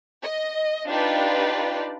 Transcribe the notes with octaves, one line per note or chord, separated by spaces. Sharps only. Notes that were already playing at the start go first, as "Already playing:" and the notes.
D#5
D4 D#4 F4 G4 B4 D5